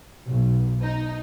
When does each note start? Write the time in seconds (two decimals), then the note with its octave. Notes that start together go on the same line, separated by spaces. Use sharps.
0.25 B1
0.81 D#4